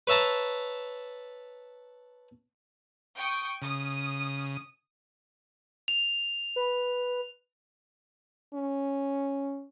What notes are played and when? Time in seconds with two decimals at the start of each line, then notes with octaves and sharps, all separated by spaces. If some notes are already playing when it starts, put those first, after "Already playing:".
0.07 B4 C#5 E5 A5 A#5
3.17 G5 C#6 D#6
3.62 C#3 D#6
5.88 F7
6.56 B4
8.54 C#4